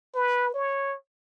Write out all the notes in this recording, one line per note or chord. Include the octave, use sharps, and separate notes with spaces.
B4
C#5